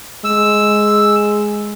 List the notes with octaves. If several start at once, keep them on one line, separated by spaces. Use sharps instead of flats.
G#3 E6